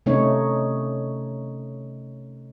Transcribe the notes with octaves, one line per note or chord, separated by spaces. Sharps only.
C3 A3 C#4 D#4 C#5